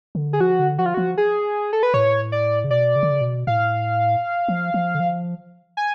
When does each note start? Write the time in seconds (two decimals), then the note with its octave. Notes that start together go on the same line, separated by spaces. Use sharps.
0.15 D3
0.33 G#4
0.40 F3 F#4
0.59 D3
0.78 F3 F#4
0.86 F4
0.94 F3 F#4
1.17 G#4
1.73 A4
1.83 B4
1.94 A2 C#5
2.32 D5
2.64 C#3
2.71 B2 D5
2.96 C#3
3.03 D3
3.10 C#3
3.21 B2
3.47 A2 F5
4.48 F3
4.74 F3
4.95 D3
5.00 F3
5.77 G#5